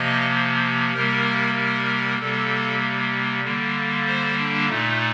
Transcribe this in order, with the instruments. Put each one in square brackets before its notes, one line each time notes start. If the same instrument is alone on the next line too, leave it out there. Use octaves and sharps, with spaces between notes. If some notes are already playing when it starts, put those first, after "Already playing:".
Already playing: [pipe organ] C3 F3 A#3 D#5
C3 G3 A#3 A#4
A#4
C3 G3 A#3 A4
D3 G3 A#3
C5
D4
A#2 A3 D#4